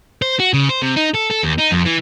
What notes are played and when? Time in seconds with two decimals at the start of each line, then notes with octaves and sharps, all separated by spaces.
0.22 C5
0.40 F#4
0.54 C#3
0.69 C5
0.82 C3
0.97 D#4
1.15 A4
1.31 A4
1.44 D#2
1.59 D#4
1.72 F2
1.86 E3